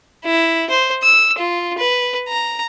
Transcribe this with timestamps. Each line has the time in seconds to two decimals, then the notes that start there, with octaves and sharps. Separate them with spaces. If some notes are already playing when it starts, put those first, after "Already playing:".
0.25 E4
0.70 C5
1.03 E6
1.38 F4
1.78 B4
2.29 A#5